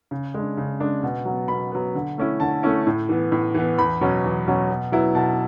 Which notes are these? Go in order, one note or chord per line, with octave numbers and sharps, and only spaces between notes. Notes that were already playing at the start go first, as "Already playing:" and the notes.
C#3
G#3 D4
C#3
G#3 D4
B2
F#3 B3
B2 B5
F#3 B3
D3
A3 C#4 E4
D3 A5
A3 C#4 E4
A2
E3 B3
A2
E3 B3
E2 B5
B2 F#3 C#4
E2
B2 F#3 C#4
B2
F#3 B3 E4
B2 A5